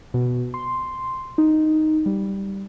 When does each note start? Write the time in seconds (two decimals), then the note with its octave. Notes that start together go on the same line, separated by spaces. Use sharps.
0.14 B2
0.54 C6
1.38 D#4
2.06 G3